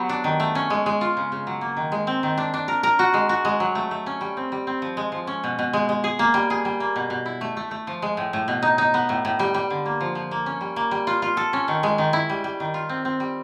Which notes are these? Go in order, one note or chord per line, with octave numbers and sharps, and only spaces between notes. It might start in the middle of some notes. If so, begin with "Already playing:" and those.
Already playing: F#3 B3 G4
D4
D#3
A3
C#4
G#3
G#3
F4
C#3
C#3
F#3
A#3
D#3
G#3
C4
D#3
D4
D4
A#4
A#4
F#4
G#3
F#4
G#3
F#3
A3
A3
C#4
G3
C4
G3
C4
F3
G#3
F3
C#4
B2
B2
G#3
G#3
G#4
A#3
G3
G#4
G3
A#3
B2
B2
E4
A3
A3
A3
F3
G#3
A2
A2
B2
D#4
D#4
B3
A2
A2
G3
G3
D3
A#3
F3
F3
A#3
C#4
G3
A#3
G3
F4
F4
A4
C#4
D#3
G#3
D#3
E4
G3
G3
D#3
F4
C4
C4
G3